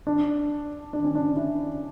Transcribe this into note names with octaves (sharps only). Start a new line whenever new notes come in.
D4
D4
C#4
D4
E4